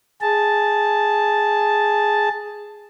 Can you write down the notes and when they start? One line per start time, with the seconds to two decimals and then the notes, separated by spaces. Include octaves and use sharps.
0.21 G#4 A5